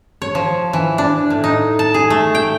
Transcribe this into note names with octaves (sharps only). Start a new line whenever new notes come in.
C#5
F3
E3
D4
A2
D#4
A5
G#4
A3
G5